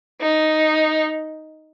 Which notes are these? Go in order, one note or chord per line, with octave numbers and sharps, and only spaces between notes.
D#4